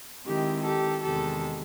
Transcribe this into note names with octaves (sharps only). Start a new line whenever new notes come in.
D#3 G#3 C4 E4 G4
G4 A4
E2 C3 D#3 G#3 G4 A4